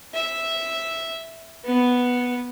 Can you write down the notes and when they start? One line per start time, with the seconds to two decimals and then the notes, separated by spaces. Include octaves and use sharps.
0.14 E5
1.65 B3